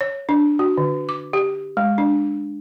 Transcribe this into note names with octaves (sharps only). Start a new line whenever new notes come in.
C#5
D4
F#4
D3
D6
G4
G#3
D4